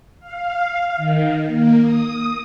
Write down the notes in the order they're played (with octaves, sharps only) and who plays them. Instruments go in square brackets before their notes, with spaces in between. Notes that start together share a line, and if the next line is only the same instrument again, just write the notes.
[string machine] F5
D#3
A#3
D#6